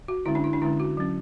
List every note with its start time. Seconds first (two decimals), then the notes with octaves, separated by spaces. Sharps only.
0.08 F#4
0.26 D3 G#3 C#4 E4
0.35 D4
0.44 E4
0.53 D4
0.62 D3 G#3 C#4 E4
0.80 F#4
0.97 F#3 C#4